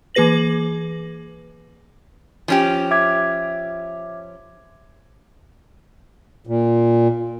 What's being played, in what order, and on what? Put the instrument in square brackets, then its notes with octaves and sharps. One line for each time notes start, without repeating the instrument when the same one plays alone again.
[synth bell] E3 A#3 G#4 B4 A#6 F#7
[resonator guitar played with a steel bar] F3 C#4 G4
[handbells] E5 D6 G#6
[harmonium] A#2